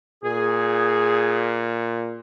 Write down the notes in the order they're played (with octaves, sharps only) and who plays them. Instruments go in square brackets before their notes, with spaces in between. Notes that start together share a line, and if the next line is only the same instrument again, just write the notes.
[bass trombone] A#2 [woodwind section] G#4